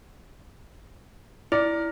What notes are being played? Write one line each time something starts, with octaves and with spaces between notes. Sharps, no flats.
E4 D5